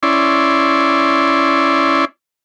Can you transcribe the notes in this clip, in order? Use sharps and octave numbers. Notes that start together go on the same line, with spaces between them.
C#4 E4 D5 C6